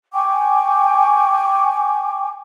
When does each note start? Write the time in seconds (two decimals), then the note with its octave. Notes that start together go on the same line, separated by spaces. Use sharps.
0.13 G5 G#5 C#6 D6